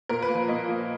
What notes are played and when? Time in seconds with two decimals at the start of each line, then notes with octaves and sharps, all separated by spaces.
0.09 A#2 A#4
0.22 B4
0.29 A#3
0.34 F3 B4
0.48 A#2 D#5
0.68 F3 A#3